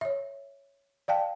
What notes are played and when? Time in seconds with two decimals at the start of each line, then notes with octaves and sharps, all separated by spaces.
0.01 C#5 E5
1.08 D5 F5 G5 A5